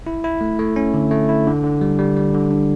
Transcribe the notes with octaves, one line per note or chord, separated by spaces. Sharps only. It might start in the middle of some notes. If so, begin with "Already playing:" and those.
E4
E4
A3
A3
C#4
D3
A3
E4
D3
D3
G3
G3
G3
D3
D4